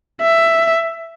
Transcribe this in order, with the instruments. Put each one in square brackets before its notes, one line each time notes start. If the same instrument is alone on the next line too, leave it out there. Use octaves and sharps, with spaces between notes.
[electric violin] E5